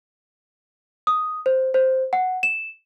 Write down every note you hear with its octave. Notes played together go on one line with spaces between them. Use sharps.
D#6
C5
C5
F#5
E7